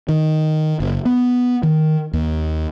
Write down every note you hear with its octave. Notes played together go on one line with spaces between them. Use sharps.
D#3
F#1
B3
D#3
D#2